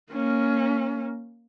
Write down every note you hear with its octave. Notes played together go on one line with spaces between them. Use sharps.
A#3 C#4